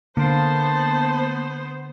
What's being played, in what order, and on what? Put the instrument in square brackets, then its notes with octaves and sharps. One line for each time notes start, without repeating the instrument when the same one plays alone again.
[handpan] D3 [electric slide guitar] A#3 A#4 F5 [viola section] B3 C5 [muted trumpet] A5